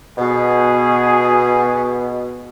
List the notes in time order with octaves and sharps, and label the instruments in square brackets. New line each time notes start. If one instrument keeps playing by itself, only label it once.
[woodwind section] B2 [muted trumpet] G#4